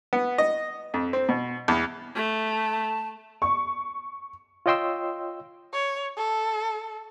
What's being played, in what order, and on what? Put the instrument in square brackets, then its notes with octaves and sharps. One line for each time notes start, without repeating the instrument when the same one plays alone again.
[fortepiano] B3
D#5
F2
C4
B2
E2
[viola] A3 [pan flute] A5
[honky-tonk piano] C#6
[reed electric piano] F4 C#5 D#5 G5 C6 E6
[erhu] C#5
A4